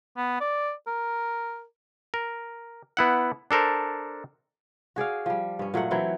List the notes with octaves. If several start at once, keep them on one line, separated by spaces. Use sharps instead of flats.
B3
D5
A#4
A#4
B3 E4 F#5
D4 A4 A#4 C5
F#4 G#4 D5 F5
F3 G3
G2 C#4
A#2 F#3 A3 F#5
E3 F#3 C4 E4